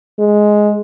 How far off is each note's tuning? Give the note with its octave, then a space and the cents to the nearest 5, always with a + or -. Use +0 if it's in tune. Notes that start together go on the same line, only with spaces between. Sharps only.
G#3 +5